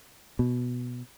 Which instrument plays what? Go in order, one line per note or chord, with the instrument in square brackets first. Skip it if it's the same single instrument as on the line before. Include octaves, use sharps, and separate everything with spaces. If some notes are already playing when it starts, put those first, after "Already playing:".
[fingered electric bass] B2